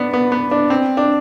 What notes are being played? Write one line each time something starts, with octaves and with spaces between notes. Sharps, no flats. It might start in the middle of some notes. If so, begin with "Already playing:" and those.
Already playing: B3 D4
B3
B3
D4
C4
D4